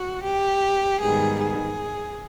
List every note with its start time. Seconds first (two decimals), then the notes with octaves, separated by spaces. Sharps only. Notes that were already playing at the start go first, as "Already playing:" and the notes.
Already playing: F#4
0.24 G4
1.01 G#2 D#3 G3 B3 G#4
1.40 G#4